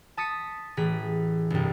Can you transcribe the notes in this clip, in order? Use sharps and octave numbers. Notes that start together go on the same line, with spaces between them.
A5 D#6 B6 C#7
A1 E3 G#4 B6
G1 C2